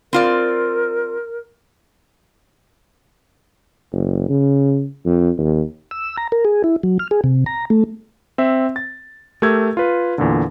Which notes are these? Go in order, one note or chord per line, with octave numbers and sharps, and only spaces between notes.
C4 F4 A#4 D5
F#1
C#3
F2
D#2
E6
A#5
A#4
G#4
E4
F#3
F6
G#4
C3
A#5
A3
C4 E5
A6
A3 G4 A#4 E6 G#6
F4 B4
E2 A#2 D3